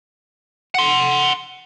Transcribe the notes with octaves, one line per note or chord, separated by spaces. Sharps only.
F#5 C6